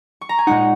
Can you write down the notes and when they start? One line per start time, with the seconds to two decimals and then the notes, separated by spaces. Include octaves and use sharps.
0.21 C#6
0.29 A#5
0.39 G#5
0.47 A#2 G#3 D#4 F#5